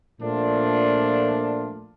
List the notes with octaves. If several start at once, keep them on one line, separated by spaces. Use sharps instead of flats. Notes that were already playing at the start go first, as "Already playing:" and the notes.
A#2 F3 A3 D4 F4